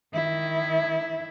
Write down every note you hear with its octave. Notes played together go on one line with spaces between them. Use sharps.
D#3 E4